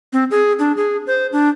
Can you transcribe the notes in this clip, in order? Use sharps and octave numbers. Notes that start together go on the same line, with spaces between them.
C4
G#4
D4
G#4
C5
D4